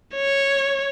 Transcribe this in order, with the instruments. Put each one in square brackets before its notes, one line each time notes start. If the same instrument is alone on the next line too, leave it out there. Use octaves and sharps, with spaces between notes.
[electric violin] C#5